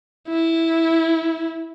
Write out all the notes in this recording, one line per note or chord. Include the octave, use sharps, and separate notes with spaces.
E4